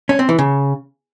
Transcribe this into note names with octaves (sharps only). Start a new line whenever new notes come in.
C#4
C4
E3
C#3